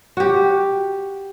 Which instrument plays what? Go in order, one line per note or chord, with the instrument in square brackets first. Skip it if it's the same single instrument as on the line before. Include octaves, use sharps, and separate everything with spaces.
[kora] F#4 G4